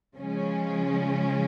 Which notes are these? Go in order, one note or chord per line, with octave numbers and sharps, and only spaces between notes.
C#3 F3 G#3 C#4